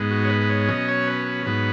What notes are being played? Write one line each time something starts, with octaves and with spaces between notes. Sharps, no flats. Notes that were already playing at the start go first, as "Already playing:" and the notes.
Already playing: G#2 G#3 B3
F#4
C#5
B4
B4
C#5
B2 F#3 C#4 D#5
C#5
B4
B4
G#2 F#3 B3 B4